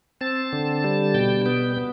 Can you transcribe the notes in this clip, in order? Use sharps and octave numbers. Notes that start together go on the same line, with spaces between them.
C4 A5
D3
G3
B2 G5
B3 G5
B3